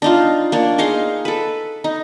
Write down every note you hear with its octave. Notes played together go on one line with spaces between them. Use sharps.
D4 D#4 F4
A#3 D4 C#5
D#4 G#4 F5 C6
A4 B4
D#4